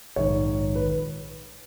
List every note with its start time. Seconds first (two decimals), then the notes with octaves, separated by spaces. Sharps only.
0.16 A#1 G#2 D#3 C#5
0.75 B4